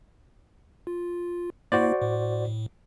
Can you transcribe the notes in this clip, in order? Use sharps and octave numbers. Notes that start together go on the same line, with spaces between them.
F4
A#3 E4 F#4 C5 D5
A2